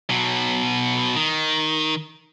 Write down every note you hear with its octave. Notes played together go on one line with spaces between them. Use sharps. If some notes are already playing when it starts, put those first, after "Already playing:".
B2 F#3
D#3